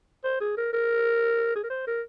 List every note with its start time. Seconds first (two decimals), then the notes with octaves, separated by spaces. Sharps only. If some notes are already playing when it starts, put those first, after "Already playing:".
0.24 C5
0.41 G#4
0.57 A#4
0.73 A#4
1.56 G#4
1.63 A#4
1.70 C5
1.87 A#4